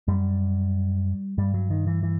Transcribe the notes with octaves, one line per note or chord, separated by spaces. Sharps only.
F#2 G3
G2 G3
F#3
D#3
E3
E3